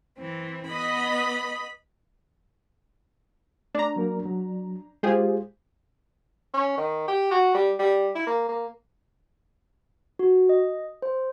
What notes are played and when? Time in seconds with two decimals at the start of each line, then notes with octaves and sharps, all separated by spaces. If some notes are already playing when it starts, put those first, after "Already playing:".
0.17 E3 C4
0.67 B3 D#5 B5
3.75 A3 D4 A#5
3.96 F#3 A#3 A#4
4.25 F#3
5.03 G#3 F4 G4 G#4 C5
6.54 C#4
6.77 D#3
7.08 G4
7.31 F#4
7.54 G3
7.79 G3
8.15 E4
8.27 A#3
8.49 A#3
10.19 F#4
10.49 D#5
11.02 C5